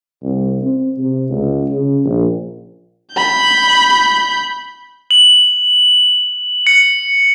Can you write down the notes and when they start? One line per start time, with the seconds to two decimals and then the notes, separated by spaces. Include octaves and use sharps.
0.23 C2
0.62 C4
0.98 C3
1.30 C#2
1.69 C#3
2.05 A#1
3.12 B5 G6
5.11 F#7
6.67 C#7